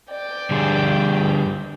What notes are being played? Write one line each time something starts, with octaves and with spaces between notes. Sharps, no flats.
D5 G5
D3 G3 G#4